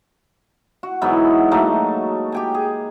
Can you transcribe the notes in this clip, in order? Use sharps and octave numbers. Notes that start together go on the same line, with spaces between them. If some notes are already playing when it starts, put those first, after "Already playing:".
F#4
G#2 E3 F#3 B3
F#3 A3 A#3 D#4
G4 G5 G#5
G#4